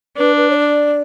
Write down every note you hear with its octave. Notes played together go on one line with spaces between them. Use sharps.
D4 B4
B4
C#5
D5